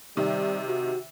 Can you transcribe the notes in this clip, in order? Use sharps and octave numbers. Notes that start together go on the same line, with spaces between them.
C3 D#3 G3
F#4